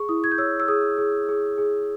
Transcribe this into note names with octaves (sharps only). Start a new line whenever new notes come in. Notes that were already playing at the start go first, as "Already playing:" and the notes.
Already playing: G#4 C#6
E4 D#6
G#6
G6
C#5 E6
E6
G#4 D#6
G#4
G#4
G#4